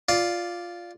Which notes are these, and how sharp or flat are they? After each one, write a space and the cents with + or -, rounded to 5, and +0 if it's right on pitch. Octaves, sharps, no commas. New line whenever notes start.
F4 +0 D5 +0